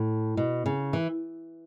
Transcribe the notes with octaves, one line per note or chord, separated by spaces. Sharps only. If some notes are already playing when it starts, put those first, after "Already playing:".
Already playing: A2
B2
C#3
E3